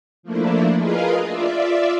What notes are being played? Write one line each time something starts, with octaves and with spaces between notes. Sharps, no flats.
F3 A3 A#3 D4 E4
F4 G#4 A#4 B4 D#5 F5
F4 D5 E5